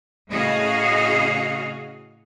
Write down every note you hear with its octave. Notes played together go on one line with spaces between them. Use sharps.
A2 C#3 F#4 G#4 D#5 F5